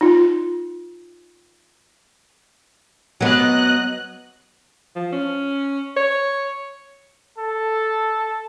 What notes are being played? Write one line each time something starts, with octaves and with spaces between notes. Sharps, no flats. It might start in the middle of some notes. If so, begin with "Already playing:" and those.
D#4 F4
F#3 B3 D#5 F#6
F3
C#4
C#5
A4